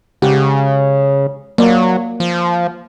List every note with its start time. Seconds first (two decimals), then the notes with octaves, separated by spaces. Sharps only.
0.22 C#3 G#3 G4 F#5
1.58 F#3 A#3 D5
2.20 F3